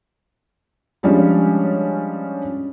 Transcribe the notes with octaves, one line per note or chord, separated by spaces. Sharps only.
F3 G3 G#3 C#4 D4